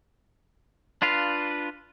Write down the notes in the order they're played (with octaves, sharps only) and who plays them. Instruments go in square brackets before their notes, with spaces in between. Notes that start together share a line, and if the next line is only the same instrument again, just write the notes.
[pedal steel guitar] D4 F4 B4 F5